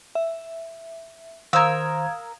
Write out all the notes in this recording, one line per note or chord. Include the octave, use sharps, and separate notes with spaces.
E5
D#3 A#4 C5 F5 A#5 D#6 E6 G#6